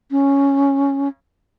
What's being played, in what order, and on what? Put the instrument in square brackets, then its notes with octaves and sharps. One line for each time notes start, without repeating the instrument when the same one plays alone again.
[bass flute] C#4